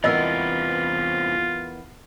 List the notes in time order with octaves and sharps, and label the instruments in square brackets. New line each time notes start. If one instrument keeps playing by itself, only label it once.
[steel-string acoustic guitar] E2 B3 A#4 [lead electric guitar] C3 E3 [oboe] F4 [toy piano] D#5 E6